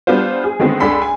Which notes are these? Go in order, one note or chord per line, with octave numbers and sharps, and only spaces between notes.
G3 B3 D4 F4 C5
G#4
D3 D#3 G#3 B3 C4
C#2 D4 G#4 A4 B5 C6
G#5